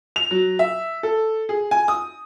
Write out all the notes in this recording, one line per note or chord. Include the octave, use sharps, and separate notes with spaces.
F7
F#3
E5
A4
G#4
G#5
D#6